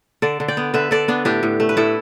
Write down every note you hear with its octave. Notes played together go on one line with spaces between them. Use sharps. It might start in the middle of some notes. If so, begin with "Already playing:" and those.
D3 A4 D5
D3
D5 G5
B3
D3 B4 E5
D3 A4 D5
B3 D4
A2 D4 G4
A2
A3
B4
A2 E4 A4